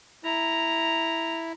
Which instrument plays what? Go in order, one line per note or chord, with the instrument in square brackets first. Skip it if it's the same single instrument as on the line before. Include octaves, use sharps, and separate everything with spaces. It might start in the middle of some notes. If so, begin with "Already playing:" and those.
[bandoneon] E4 [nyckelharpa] A#5